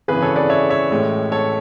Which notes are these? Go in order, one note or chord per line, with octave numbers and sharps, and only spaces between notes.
G#1 F#2 C#3 E3 G#4 B4
A4 C#5
B4 D5
C#5 E5
C#5 E5
A1 A2 G#3
A4 C#5